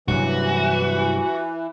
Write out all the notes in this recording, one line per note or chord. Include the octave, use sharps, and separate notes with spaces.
G2 C3 E3 F#3 F#4 B4